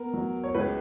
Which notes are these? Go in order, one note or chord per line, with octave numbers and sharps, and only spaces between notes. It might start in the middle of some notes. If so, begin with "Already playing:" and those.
Already playing: B3 A#4
F#3
C#5
C#2 B4